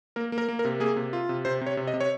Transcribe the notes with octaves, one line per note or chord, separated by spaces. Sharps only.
A#3 A#4
A#3
A#4
A#3
A#4
C3
A#3 G#4
C3
F4
C3
C3 C5
C3
C#5
C3
D#5
C3
C#5